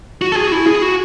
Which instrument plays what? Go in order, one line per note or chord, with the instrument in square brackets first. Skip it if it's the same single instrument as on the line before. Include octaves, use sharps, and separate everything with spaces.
[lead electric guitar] F#4
A4
G#4
F#4
E4
G#4
F#4